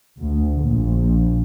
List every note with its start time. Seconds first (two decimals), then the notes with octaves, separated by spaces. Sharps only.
0.19 D2
0.61 A#1